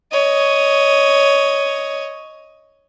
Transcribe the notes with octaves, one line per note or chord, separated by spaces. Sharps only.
C#5 D#5